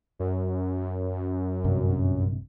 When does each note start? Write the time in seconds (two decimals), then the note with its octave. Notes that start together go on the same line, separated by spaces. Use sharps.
0.19 F#2
1.64 A#1 G2 C3